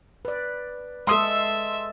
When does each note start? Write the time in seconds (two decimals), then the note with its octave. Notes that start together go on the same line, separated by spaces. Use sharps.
0.25 B4 D5
1.07 G#3 A4 E5 C6 D#6